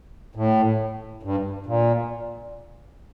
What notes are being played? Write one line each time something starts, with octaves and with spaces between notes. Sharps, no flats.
A2
G2
A#2